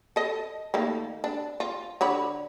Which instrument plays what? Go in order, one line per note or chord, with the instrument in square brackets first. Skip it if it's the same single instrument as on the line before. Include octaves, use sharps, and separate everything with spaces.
[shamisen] A4 D#5
D#3 A3 A#3
D4
F4
D3 C#5 B5